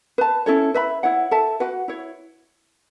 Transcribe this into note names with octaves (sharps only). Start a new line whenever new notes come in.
B4 A5
C#4 E4 A4 C#5
B4 E5 B5
E4 C#5 F#5
A4 E5 A5
F#4 B4 F#5
E4 C#5